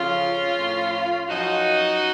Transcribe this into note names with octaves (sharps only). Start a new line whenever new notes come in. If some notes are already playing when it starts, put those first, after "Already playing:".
Already playing: F2 C#3 F3 C#4 F4
A2 F3
F#2 F3 D#4 F#4